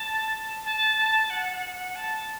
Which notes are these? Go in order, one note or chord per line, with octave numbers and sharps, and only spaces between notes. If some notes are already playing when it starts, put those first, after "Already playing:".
Already playing: A5
A5
A5
F#5
F#5
F#5
A5